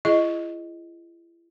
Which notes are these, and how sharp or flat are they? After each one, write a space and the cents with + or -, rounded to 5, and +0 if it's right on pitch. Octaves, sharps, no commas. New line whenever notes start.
E4 +40 G#4 +0 D#5 +0